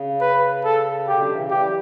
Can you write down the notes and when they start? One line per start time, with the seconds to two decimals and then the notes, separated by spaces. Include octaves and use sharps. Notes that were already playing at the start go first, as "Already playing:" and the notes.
Already playing: C#3
0.21 B4
0.64 A4
1.07 B2 D3 G4
1.19 F#3
1.29 C#3 E3
1.50 E3 G3 G4
1.63 F#3